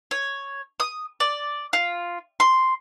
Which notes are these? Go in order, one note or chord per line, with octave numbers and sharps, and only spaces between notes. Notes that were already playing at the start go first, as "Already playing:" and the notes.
C#5
D#6
D5
F4
C6